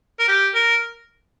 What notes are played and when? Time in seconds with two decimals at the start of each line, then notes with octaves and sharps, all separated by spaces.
0.19 A#4
0.28 G4
0.55 A#4